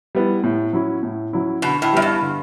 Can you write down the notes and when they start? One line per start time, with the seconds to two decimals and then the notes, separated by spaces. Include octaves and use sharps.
0.15 G3 B3 E4
0.43 A2
0.73 F#3 C#4 E4
1.03 A2
1.33 F#3 C#4 E4
1.62 B2 D3
1.82 A2
1.93 F#2 G3 B3 E4
2.02 G2
2.21 D3